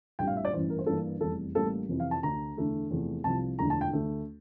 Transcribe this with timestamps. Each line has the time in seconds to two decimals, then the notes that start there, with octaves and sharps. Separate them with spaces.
0.19 A#1 A2 G3 C4 G5
0.27 F5
0.36 E5
0.45 D5
0.53 A1 G2 E3 C5
0.70 A#4
0.79 C5
0.86 G2 E3 A#3 A4
1.21 F1 E2 C3 G3 A4
1.55 A1 A2 G3 A#3 A4
1.89 F2 C3 E3
2.00 F5
2.11 A5
2.23 D2 D3 A3 D4 A#5
2.57 E2 D3 A3 D4
2.90 E2 C3 F3 A3
3.24 C2 C3 F3 A5
3.59 E1 E2 D3 F3 A3 A#5
3.70 A5
3.81 G5
3.92 D2 D3 A3